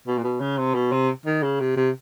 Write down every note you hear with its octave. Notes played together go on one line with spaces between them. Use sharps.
B2
A#2
B2
C#3
C3
B2
C3
D#3
C#3
C3
C3